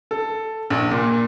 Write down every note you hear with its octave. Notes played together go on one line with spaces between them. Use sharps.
A4
A#1
A#2